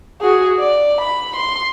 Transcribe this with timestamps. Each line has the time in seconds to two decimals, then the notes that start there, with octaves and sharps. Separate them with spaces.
0.21 F#4 G#4
0.59 D5
1.01 B5
1.36 C6